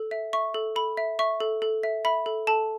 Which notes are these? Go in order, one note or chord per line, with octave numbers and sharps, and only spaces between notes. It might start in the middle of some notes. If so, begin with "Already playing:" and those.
Already playing: A4
E5
E5 C#6
A4
A4 B5
E5
E5 C#6
A4
A4
E5
E5 B5
A4
A4 A5